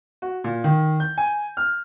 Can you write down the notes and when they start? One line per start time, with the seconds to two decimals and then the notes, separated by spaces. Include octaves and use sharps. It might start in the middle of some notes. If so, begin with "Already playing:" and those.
0.22 F#4
0.44 A#2
0.64 D#3
1.00 G6
1.18 G#5
1.57 F6